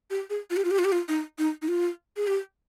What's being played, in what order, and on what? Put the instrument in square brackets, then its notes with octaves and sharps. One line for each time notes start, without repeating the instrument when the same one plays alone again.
[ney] G4
G#4
F4
G4
F4
G4
F4
G4
F4
D#4
D#4
D#4
F4
G#4
G4